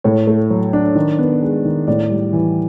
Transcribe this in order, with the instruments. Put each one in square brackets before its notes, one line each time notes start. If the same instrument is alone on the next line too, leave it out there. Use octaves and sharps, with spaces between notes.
[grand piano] A2 C#5
A3
F#3
D4
D#3
B3
G#3
D#3
A2 D5
G3
E3